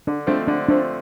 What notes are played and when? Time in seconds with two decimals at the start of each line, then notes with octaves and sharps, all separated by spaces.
0.07 D3 D4
0.27 F3 A3 C4 D4
0.47 D3 D4
0.68 F3 A3 C4 D4